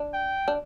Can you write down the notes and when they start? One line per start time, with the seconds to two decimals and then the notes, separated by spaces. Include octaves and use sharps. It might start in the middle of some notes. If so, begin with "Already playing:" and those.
Already playing: D4
0.13 G5
0.48 D4